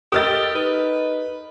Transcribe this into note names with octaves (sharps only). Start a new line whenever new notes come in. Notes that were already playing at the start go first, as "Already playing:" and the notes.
G4 A4 A#4 D#5 D#6 F6 A6
D#4 B4